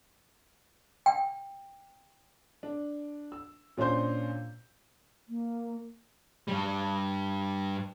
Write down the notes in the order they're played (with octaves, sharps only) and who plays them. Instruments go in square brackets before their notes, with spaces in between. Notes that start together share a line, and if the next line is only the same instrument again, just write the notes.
[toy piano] G5
[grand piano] D4
E6
A#2 C#4 D4 C5 G6
[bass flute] A#3
[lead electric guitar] G2 G3